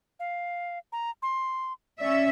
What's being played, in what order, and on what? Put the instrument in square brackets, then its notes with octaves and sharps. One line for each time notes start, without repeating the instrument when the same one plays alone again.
[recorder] F5
A#5
C6
[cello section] C#4 E5 [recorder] D5